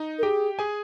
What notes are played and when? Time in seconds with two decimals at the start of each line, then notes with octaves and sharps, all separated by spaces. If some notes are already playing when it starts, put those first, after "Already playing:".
Already playing: D#4 D#5
0.18 A#4
0.23 G4 G#4 G5
0.59 G#4 G#5